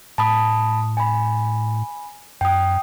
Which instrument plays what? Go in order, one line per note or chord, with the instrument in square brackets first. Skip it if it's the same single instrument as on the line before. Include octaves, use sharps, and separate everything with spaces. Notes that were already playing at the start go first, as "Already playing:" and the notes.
[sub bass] A2 [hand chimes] A5 B5 D#6
[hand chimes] G#5 B5
[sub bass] F#2 [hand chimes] G5 D#6